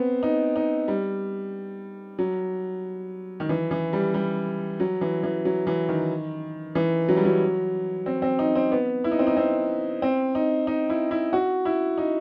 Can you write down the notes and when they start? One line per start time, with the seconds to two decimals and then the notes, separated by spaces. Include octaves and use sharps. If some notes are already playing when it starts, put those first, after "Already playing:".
Already playing: B3 C4
0.23 D#4
0.56 D#4
0.88 G3
2.19 F#3
3.40 D#3
3.49 E3
3.71 E3
3.93 G3
4.14 G3
4.80 F#3
5.01 E3
5.23 E3
5.45 F#3
5.67 E3
5.89 D#3
6.75 E3
7.09 F#3
7.16 G3
7.25 F#3
8.06 C4
8.22 C4
8.39 D#4
8.55 C4
8.72 B3
9.04 E4
9.11 D#4
9.19 C4
9.27 D#4
9.37 C4
10.02 C4
10.35 D#4
10.67 D#4
10.90 E4
11.11 E4
11.33 F#4
11.65 E4
11.98 D#4